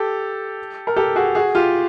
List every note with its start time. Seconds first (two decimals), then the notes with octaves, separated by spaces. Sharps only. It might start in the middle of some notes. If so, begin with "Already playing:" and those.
Already playing: G4 A4
0.87 A#4
0.96 G4 A4
1.16 F#4 G#4
1.35 F#4 G#4
1.55 F4 G4